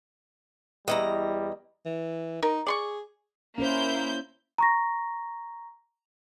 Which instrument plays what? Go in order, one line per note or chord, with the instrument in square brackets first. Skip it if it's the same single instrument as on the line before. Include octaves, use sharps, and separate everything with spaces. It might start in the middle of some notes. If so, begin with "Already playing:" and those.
[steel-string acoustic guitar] E2 E4 A#5 [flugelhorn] G3 [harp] D#5
[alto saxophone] E3
[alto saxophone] D#4 [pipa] A#4
[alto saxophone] G#4 [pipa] D5 C6 C#6
[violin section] A#3 E4 G6 [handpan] C#4 A#4 C5
[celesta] A#5 C#6 A#6